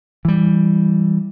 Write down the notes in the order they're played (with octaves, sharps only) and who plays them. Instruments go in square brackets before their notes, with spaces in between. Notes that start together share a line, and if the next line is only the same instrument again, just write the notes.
[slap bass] E3 G3